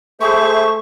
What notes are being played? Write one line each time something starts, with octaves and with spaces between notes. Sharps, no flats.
A3 G#4 C5 E5 C#6